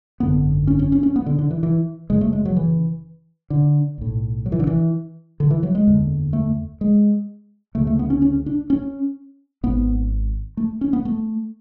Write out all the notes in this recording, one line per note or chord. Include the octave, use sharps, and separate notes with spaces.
G#1 F#2 D3 B3
C#4
C#4
C#4
C#4
B3
D3
D3
E3
E3
F#1 F#2 C#3 G#3
A3
G#3
F#3
E3
D3
B1 A2
F#3
E3
D3
E3
D3
E3
F#3
G#3
F#1 E2 D3
A3
G#3
D2 C#3 A3
A3
B3
C#4
C#4
D4
C#4
G#1 G#2 B3
A3
C#4
B3
A3